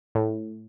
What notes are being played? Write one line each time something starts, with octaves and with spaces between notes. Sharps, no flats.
A2